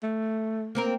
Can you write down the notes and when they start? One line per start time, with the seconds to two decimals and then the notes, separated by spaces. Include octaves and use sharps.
0.03 A3
0.75 A#3 C4 A#4